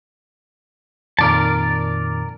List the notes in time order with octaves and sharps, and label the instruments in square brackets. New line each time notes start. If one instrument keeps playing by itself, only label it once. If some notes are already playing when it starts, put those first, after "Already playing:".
[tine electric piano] F2 A#2 D#3 [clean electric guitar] A#4 D5 A5